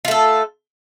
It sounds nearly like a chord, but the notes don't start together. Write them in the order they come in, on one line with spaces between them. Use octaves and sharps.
F4 A3 A4